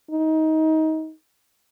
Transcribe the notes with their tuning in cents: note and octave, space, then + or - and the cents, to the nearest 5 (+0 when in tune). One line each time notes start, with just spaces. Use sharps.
D#4 +20